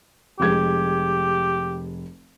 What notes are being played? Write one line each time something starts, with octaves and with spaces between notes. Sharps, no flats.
F1 G#3 G4 G#6